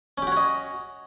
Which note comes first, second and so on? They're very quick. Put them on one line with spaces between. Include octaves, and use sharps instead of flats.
C#4 G4 F#4 C#5 D#5